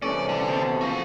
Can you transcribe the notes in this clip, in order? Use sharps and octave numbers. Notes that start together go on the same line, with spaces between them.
C2 C3 E3 C#4 A4 D5
D3
B2 C4
F3 F#4 F5